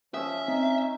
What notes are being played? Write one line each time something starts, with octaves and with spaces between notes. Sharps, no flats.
F3 C#4 E5 D#6
C4 D#4